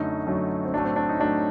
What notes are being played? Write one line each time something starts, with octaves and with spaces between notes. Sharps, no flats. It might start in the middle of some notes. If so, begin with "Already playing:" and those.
Already playing: F#2 D3 F#3 A3 D#4
F#2 D3 F#3 A3
C4
A2 F#3 A3 D4
C4
D4
D#4
A2 F#3 A3 D4